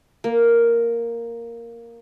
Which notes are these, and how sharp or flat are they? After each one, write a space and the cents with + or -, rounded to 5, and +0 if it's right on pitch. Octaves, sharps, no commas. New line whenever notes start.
A#3 +0